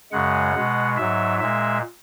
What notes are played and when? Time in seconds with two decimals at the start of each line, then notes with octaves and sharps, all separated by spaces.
0.12 F#2 C#3 G#3 F#5
0.55 B2 G#3
0.97 G#2 F#3 E5
1.39 A#2 G#3 E5